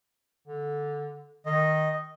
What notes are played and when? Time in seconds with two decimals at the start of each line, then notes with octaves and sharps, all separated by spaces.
0.47 D3
1.46 D#3 D#5